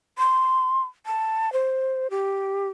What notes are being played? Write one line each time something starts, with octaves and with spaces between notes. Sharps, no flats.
C6
A5
C5
G4